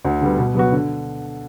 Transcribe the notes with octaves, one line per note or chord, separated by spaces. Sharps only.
D2
D3 G3 B3
B2
F#3 B3 F#4
D3